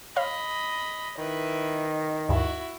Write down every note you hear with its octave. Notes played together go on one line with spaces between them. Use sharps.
C#5 D#5 F5 B5 C6
D#3 E4 B4
D2 G2 E4 F#4